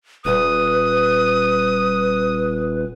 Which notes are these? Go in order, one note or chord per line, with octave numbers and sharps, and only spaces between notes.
D#1 B4 D#6